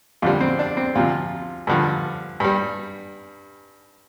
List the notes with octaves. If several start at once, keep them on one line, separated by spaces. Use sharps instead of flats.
F2 D3 G3 F4
C4
D4
C4
D2 C3 F3 F4
G2 D3 F3
G2 G3